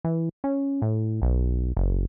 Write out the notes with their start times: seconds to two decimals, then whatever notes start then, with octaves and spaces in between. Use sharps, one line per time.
0.04 E3
0.44 C#4
0.82 A2
1.22 B1
1.77 F#1